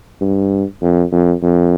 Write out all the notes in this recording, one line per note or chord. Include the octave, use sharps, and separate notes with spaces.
G2
F2
F2
F2